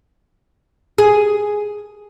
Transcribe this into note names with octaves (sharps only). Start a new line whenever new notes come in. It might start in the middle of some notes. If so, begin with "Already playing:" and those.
G#4